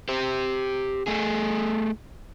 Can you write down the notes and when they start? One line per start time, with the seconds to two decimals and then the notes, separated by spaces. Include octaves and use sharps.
0.09 G4 C5
1.07 A3 G#4